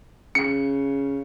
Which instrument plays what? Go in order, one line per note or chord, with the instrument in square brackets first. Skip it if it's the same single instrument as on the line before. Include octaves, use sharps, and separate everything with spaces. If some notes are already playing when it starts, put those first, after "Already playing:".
[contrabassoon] C#3 [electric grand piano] C#7